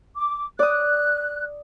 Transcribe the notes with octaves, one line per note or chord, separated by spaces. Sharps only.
D6
D5 D#6 F#6